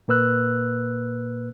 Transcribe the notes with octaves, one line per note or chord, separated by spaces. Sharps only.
A#2 A#3 B4 E6 F#6